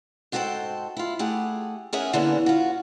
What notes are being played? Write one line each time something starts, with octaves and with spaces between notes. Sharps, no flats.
G#2 F#4 A4 C5 G5 A5
E4 F4
A3 G4 G#4 F#5
C#4 D#4 G#4 A#4 E5 F#5
D3 E3 A#3 B3 C#4 D4
F4 F#4